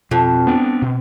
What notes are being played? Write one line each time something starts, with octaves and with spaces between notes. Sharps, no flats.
F2 B2
B3 D4
B2